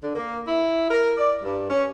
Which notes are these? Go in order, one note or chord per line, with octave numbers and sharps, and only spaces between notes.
D3
A#3
E4
A#4
D5
G2
C#4